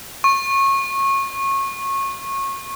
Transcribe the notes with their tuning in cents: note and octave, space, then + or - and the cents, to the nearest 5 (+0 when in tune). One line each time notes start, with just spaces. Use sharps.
C#6 -25